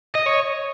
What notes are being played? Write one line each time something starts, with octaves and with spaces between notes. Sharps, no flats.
D#5
C#5